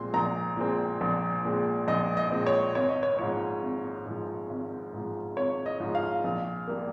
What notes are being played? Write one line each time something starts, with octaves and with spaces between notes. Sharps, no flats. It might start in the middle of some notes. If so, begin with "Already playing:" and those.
Already playing: A#1 A#2 G#3 C4 C6
A#1 A#5
A#2 G#3 C4
A#1
A#2 G#3 C4
A#1 D#5
D#5
A#2 G#3 C4
C#5
G#1 C#5
D#5
C#5
G#2 F3 C#5
G#1
G#2 F3
G#1
G#2 F3
G#1 C#5
D#5
G#2 F3
F5
A#1
G3 A#3